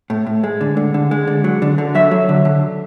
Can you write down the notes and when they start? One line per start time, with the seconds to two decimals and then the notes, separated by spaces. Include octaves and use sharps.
0.10 A2
0.27 A2
0.44 G#3
0.61 D3
0.77 D3
0.94 D3
1.11 G#3
1.27 D3
1.44 F#3
1.62 D3
1.78 D3
1.95 F#3 E5
2.11 F#3
2.29 D3
2.45 D3